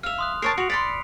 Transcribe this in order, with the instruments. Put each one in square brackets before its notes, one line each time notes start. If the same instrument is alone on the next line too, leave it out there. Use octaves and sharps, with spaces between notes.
[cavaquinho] E5 F5 [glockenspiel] F6 F7
[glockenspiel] C6 D#6 F#6
[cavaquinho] A#4 C#5 A5 [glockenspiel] C7 D7
[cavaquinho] F#4 [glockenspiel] C#7 F7
[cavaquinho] D5 B5 C6 [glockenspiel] B6